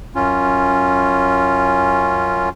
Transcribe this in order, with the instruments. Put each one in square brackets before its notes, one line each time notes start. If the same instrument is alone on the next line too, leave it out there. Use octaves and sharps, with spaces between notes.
[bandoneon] F#2 C#4 F4